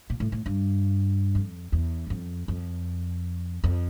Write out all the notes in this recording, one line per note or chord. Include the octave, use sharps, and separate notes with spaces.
A#2
A2
A2
G2
F2
E2
G2
F2
F2
F2